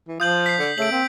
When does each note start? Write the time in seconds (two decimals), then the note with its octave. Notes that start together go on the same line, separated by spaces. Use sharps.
0.08 E3
0.20 F3 F4 D#6 G6 F#7
0.46 B6 C7
0.59 D3
0.78 C#3 A3 D7 F#7
0.91 A#3 C4